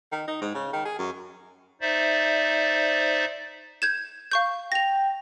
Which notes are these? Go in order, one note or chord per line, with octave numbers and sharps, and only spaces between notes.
D#3
D#4
G#2
C#3
D#3
G#4
F#2
D#4 C5 D5 E5
G6 G#6 E7
F5 C#6 G6
G5 A#6 F7